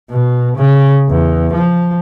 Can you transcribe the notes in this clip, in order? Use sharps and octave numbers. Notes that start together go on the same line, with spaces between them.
B2
C#3
E2
F3